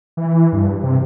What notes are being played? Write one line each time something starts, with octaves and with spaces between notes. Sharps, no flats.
E3
G2
C3